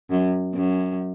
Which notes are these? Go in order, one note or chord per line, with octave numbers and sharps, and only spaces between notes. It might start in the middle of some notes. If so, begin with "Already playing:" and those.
F#2
F#2